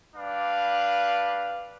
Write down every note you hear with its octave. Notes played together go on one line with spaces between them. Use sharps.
G3 D4 B4 F5